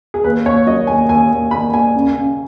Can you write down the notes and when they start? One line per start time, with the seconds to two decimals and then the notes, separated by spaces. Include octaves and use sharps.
0.14 G#4
0.24 D#2 B4
0.46 D#2 C#5
0.67 F#3 D#5
0.87 D#2 G#5
1.09 D#2 G#5
1.31 D#2
1.51 D#2 B5
1.72 D#2 G#5
1.95 C#3
2.15 C#3